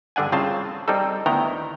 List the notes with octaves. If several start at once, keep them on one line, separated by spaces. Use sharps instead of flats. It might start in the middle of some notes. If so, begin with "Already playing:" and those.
G2 D3 D4 F#5 G#5
C2 C#3 C4 F4 C5 A5
G3 C4 D#4 A4
D2 D#3 B3 E4 G5 A#5